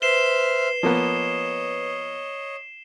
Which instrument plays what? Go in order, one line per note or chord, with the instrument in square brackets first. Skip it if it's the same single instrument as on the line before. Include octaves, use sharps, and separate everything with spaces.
[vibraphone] B4 [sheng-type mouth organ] C5 E5 F6 [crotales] C7 E7 G7
[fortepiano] F3 A#3 B3 [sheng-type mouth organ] C#5 D#5